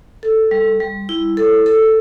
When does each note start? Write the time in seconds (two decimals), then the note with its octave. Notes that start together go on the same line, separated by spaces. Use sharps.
0.23 A4
0.51 G3
0.80 G3
1.09 E4
1.37 A4
1.66 A4